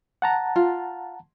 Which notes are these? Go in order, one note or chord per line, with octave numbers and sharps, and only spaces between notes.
F#5 A5 A#5
F4